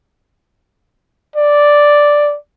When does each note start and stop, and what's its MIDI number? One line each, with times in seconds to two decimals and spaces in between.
1.36 2.36 74